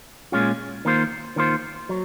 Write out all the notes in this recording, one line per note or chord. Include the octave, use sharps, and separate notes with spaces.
A#2 G#3 C#4 F4
D#3 A#3 F4 C5
D#3 A#3 F4 C5
F#3